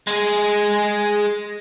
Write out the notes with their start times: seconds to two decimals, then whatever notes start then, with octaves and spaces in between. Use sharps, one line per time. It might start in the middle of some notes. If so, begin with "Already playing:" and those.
0.07 G#3 G#4